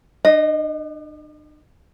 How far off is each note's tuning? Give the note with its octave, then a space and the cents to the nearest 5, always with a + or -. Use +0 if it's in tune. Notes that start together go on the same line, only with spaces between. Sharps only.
D4 +45 D#5 +0